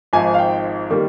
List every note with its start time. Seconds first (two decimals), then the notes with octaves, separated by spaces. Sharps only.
0.13 G#1 G#2 F3 G#5
0.34 F5
0.38 G5
0.90 D#3 G3 A#3